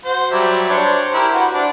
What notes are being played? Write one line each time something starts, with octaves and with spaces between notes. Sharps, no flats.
F#4 C5
F#3 G3 E5
D4 C5 C#5
E4 G4 A#4
F#4 B4 C5
D4